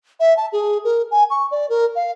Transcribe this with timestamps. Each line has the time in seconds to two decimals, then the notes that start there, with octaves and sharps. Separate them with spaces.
0.20 E5
0.37 A5
0.52 G#4
0.84 A#4
1.11 G#5
1.30 C#6
1.51 D5
1.69 A#4
1.95 F5